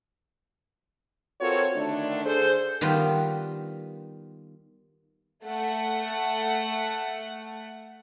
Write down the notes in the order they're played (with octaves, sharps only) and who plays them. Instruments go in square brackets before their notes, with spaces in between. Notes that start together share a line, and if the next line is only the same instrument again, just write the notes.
[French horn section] C4 F4 F#4 A4 A#4 C#5
D3 D#3 A3 D4
D3 G#4 A4 C5
[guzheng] D#3 G3 B3 F4 B4
[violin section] A3 F#5